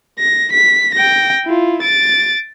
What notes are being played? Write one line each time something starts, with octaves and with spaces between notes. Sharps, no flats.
A#6
B6
G5 A#6
E4 F4
A6 D7